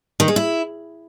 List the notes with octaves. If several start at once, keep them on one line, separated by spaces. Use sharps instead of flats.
D#3
G#3
E4